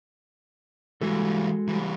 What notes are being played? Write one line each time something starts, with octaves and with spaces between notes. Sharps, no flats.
E3 G3 G#3 F#4 A4
E3 G3